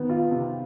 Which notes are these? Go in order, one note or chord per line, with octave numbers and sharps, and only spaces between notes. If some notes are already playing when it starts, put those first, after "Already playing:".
Already playing: D#3 B3
F4
C3